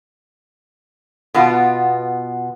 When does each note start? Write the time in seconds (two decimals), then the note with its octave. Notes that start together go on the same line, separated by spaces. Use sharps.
1.34 B2 B3 F4